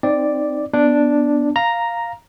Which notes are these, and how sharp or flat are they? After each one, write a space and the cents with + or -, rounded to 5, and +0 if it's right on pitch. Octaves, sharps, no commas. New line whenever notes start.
C4 +0 D#4 -10 D5 +0
B3 +0 D4 +0
F5 +0 A#5 +0